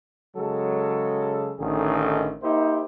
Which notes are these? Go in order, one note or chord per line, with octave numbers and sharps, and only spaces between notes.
C#3 F#3 G#3 A4
A1 D3 D#3 D#4 G#4
A#3 D#4 E4 G4 C5